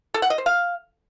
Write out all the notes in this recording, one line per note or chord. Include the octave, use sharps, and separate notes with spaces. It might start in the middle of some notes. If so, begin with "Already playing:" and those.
A4
F#5
D#5
C5
F5